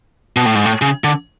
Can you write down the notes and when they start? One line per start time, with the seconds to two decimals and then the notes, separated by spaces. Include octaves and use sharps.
0.36 B2
0.46 A2
0.55 G#2
0.65 A2
0.82 C#3
1.04 D3